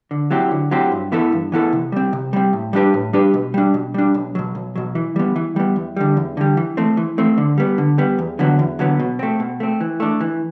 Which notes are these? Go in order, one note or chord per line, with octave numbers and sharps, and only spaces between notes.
D3
F#3 C4 E4 G4
D3
F#3 C4 E4 G4
G2
E3 B3 E4 A4
G2
E3 B3 E4 A4
C3
G3 C4
C3
G3 C4
A2
G3 D4 G4 B4
A2
G3 D4 G4 B4
B2
G3 D4
B2
G3 D4
B1
B2 F#3
B1
B2 F#3
E3
G3 B3
E3
G3 B3
E2
D3 G3
E2
D3 G3
E3
A3 C4
E3
A3 C4
D3
G3 B3
D3
G3 B3
E2
D3 F#3 B3
E2
D3 F#3 B3
B2
A3 C4
B2
A3 C4
E3
A3 D4
E3